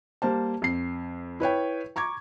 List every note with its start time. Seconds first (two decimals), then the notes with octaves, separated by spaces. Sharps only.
0.22 G3 A#3 C5 A5
0.62 F2 C7
1.40 E4 B4 C#5 G5
1.96 A#5 C#6 D6 G#6